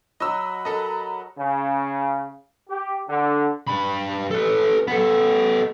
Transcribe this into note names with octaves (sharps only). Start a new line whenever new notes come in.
F#3 F#4 D#5 B5 E6
A4 A#4 D#5
C#3
G4
D3
G2 B5
A4 B4
B3 A4